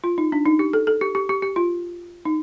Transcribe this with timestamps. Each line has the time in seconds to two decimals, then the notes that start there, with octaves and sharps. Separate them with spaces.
0.04 F4
0.18 D#4
0.32 D4
0.46 D#4
0.59 G4
0.73 A4
0.87 A4
1.01 G4
1.15 G4
1.29 G4
1.42 G4
1.56 F4
2.25 D#4